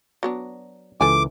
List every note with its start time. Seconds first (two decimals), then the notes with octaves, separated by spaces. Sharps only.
0.23 F#3 B3 D4 A#5
1.01 C#2 E3 A4 G#5 D6